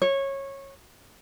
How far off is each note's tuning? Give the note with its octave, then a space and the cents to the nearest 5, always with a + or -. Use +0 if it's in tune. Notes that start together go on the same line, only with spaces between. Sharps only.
C#5 -15